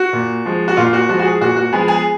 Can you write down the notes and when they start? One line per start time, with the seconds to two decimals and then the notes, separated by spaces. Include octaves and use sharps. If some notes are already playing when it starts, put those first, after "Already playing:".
Already playing: F#4
0.13 A#2
0.46 F3 G#3
0.68 F#4
0.77 A#2 F4
0.93 F#4
1.09 F3 G#3 F#4
1.19 F#4
1.25 G#4
1.41 A#2 F#4
1.56 F#4
1.73 F3 G#3 B3 G#4
1.88 G#4